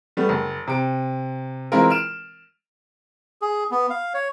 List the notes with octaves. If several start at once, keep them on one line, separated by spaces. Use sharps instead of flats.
G3 A3 B3
F#1
C3 D7
E3 G#3 C4 E4 F4 A#4
F6 D7 E7
G#4
B3
F5
C#5